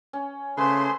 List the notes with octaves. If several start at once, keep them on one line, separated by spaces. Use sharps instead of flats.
C#4
C#3 A3 G#4 B4 C5 C6